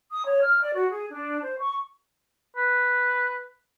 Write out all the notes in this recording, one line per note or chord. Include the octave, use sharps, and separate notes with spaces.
D#6
C#5
F6
D5
F#4
G#4
D4
C5
C#6
B4